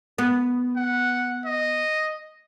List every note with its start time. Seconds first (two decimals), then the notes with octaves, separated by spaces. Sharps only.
0.18 B3
0.76 F#5
1.45 D#5